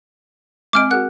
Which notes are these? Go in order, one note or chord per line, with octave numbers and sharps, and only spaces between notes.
G#3 C4 D#5 D6 F6 D7
F#4 G#4 A#4 F#5 F#6